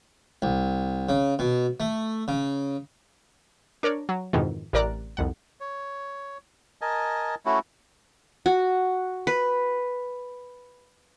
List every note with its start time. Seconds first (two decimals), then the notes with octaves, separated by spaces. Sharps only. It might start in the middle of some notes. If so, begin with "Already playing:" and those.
0.42 C2
1.09 C#3
1.39 B2
1.80 A3
2.28 C#3
3.83 D4 A#4 C#5 D5
4.09 F#3
4.33 F2 G#2 B2 D#3 E3
4.73 A1 C3 A#4 D5 A#5 F#6
5.17 C2 F2 F#5
5.60 C#5
6.82 A#4 D#5 G#5 A5
7.46 A3 C#4 E4 F#4
8.46 F#4
9.27 B4